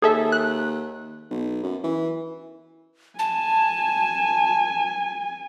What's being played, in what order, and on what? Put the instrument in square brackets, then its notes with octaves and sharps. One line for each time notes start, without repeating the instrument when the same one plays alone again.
[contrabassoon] D#2 [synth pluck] G#4 A4 E5
[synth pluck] F#6
[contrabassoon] B1
F#2
E3
[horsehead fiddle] G#5 [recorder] A5